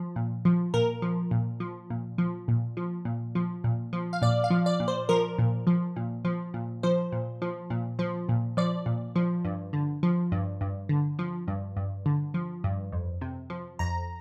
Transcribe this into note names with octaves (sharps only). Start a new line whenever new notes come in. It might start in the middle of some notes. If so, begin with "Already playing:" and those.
Already playing: F3
A#2
F3
A#2 A#4
F3
A#2
F3
A#2
F3
A#2
F3
A#2
F3
A#2
F3
F5
A#2 D5
F5
F3
D5
A#2
C5
F3 A#4
A#2
F3
A#2
F3
A#2
F3 C5
A#2
F3
A#2
F3
A#2
F3 D5
A#2
F3
G2
D3
F3
G2
G2
D3
F3
G2
G2
D3
F3
G2
F2
C3
F3
F2 A#5